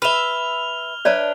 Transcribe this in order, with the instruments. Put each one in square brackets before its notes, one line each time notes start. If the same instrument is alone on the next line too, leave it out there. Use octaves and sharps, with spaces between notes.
[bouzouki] B4 E5 [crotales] F6 F7 G7
[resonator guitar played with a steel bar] D4 B4 E5 [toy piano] C#5 D5 A#5